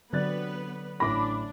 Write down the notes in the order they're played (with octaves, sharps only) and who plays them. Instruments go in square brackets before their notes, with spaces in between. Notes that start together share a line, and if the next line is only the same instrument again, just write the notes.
[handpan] D3 F#3 C4 [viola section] B3 B4 [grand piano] D5 F#6 A6
[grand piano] A1 E3 A#6 [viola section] D4 [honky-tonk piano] B5 D6